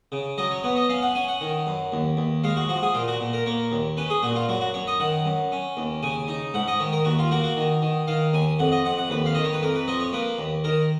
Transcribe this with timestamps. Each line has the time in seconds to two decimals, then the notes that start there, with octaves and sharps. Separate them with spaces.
0.12 C#3
0.38 F#3 D#5
0.51 C#5
0.64 B3 C#5
0.76 D#5
0.89 C#4 F5
1.02 F#5
1.15 C#4 G#5
1.28 F#5
1.41 D#3
1.67 F#2
1.92 D#2
2.17 D#2
2.44 G#3 F5
2.56 F#4
2.69 F3 F#4
2.83 G#4
2.94 A#2 F4
3.08 F#4
3.21 A#2
3.33 A#4
3.46 A#3 C#5
3.72 D#2
3.97 C#4 B4
4.10 G#4
4.23 A#2 F#4
4.36 F4
4.49 F#2 F#4
4.61 F#4
4.74 F#2 C#5
4.87 D#5
5.00 D#3 F#5
5.26 F#2
5.52 C#4
5.77 D#2
6.03 C#3 G#5
6.28 D#4
6.54 G#2 F#5
6.67 D#5
6.80 D#3 C#5
6.92 A#4
7.05 D#2 F#4
7.19 F4
7.31 A#3 F#4
7.43 F#4
7.57 D#3
7.82 D#3
8.07 D#3 F5
8.33 D#2 G#5
8.59 F2 F#5
8.72 D#5
8.85 F2 F#5
8.98 F#5
9.10 D#2 B4
9.26 F5
9.34 D#3 D#5
9.44 C#5
9.53 B4
9.62 F2 A#4
9.75 B4
9.88 F3 D#5
10.00 C#5
10.13 A#3 B4
10.38 D#2
10.64 D#3 A#4